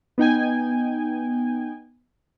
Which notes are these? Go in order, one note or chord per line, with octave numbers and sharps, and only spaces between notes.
B3 D#4 G5 G#5